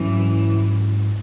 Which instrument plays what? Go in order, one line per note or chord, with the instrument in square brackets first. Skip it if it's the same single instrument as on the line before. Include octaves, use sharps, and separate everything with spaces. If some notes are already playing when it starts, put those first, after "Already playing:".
Already playing: [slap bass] G#2 F#3 C#4 [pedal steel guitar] E3